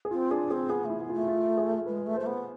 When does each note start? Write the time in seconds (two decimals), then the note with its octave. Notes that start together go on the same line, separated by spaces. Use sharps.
0.05 G#4
0.11 C4 F4
0.31 D4 G#4
0.50 C4 G#4
0.69 B3 G#4
0.85 A3
0.90 E4
0.99 B3
1.09 A3 F4
1.28 F4
1.57 G#4
1.86 G#3 B4
2.06 A3
2.16 A3 C5
2.26 B3